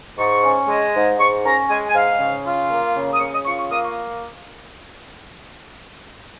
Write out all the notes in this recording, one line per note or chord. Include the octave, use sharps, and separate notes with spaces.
G#2 C#6
C#4
G#3
G#2
G#2 C#6
C#4 A#5
G#3 G#5
G#5
G#2 F5
C#3
F4
A#3
C#3
D#6
C#3 C#6
D#6
F4 C#6
C#6
A#3 D#6
C#6